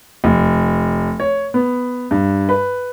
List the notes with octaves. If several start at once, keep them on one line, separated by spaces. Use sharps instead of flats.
F1
C#5
B3
G2
B4